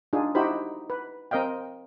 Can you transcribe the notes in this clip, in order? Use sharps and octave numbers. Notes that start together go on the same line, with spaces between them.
D4 D#4 F4 G#4
D#4 E4 F#4 G4 C5 B5
B4
C4 A#4 D#5 F5 G5